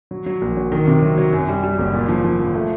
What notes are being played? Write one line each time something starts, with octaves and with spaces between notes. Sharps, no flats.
F#3
F#3
A#1
F#3
D#3
C3
F#3
F#3
F#2
G3
G3
F#1
A#2
F3
F3
F3
A3